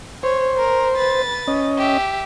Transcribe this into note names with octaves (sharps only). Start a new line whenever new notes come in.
C5 C#5
A#4
B4 A6
C#4 D#5
G4 E5